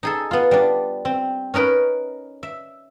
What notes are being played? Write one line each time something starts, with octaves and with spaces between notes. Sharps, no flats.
D#4 G#4 A4
B3 F4
G3 D4
C4
C#4 D#4 A#4 B4
E5